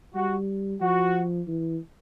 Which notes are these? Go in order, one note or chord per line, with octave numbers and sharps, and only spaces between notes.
G3 F#4
F3 F#4
E3